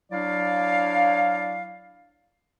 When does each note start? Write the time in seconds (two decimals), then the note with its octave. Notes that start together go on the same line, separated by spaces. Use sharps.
0.12 F#3 D4 E4 D5 F5